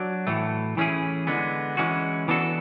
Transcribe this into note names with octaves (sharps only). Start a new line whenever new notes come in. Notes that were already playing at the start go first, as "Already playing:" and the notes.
Already playing: F#3 D4
A2 E3 A3
E3 A3 C#4 E4 G#4
D3 G#3 B3
E3 G#3 C#4 F#4
E3 B3 D4 F#4 A4